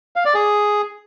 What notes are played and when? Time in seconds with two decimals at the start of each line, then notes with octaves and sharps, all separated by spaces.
0.16 F5
0.25 D5
0.34 G#4